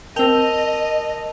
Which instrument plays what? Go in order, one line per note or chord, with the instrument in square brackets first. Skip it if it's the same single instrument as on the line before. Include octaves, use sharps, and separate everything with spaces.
[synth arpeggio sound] C4 G5 [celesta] A#4 E6 [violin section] D#5 [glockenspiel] A5 F7 G7